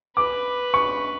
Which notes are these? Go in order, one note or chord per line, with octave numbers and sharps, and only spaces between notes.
B4 D6
C#6